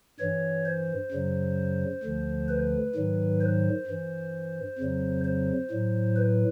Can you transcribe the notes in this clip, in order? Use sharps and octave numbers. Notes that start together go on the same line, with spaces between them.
G2 E3 C#5
C5
F#2 C#3 F#3
D2 D3 F3
B4
G#2 D#3 F#3
C5
G2 E3
F2 C#3 F#3
C5
A2 F#3
B4